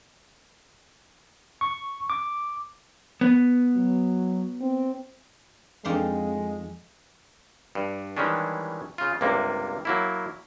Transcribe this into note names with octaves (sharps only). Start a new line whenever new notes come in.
C#6
D6
B3
F#3
C4
F2 G#3 D#4 F5
G2
D#3 E3 G3 G#3 C#4 D4
C#3 F4
C#2 G2 C3 A#3
F#3 A#3 E4